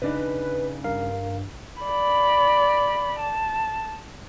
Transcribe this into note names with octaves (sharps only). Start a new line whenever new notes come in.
C#3 D4 D#4 B4
G2 A#4 F5
D5 B5
A5